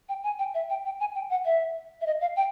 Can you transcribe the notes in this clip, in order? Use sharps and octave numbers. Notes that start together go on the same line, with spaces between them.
G5
G#5
G5
E5
G5
G5
G#5
G5
F#5
E5
E5
D#5
F5
G5